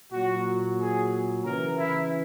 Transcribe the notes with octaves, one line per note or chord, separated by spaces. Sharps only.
A#2 F#3 F#4
G#4
C#3 E3 A#4
E4